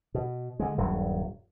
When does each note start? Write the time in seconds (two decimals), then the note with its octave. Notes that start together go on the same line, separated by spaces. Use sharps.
0.14 B2
0.60 D3 G#3
0.77 D#1 G2 F#3